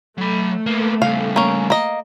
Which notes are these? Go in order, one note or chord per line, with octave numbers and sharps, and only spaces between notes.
F#3 A3 B5
A#3 B3
C#3 G3 F5
A#3 C#4
A#3 D#5